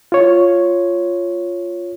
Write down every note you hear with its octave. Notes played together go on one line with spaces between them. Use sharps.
F4 C#5